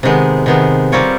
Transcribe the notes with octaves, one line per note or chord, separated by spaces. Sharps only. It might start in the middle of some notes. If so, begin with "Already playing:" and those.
C3 D#3 G#3 B3
C3 D#3 G#3 B3
G3 C4 F4 A#4 C#5